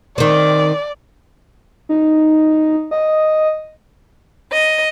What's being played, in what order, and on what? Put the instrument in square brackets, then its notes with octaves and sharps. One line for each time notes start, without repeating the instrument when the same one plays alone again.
[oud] D#3 C4 [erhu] D5
[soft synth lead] D#4
D#5
[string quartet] D#5